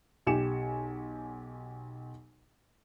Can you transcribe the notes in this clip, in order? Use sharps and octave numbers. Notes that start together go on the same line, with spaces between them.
B1 G4 G#5 C#7 E7